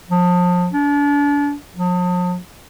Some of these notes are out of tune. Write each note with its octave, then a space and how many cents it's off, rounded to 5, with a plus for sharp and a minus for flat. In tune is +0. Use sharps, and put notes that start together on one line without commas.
F3 +30
D4 -35
F3 +45